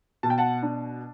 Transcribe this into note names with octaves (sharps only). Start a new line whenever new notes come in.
B2 A5
G5
F#5 A5
D4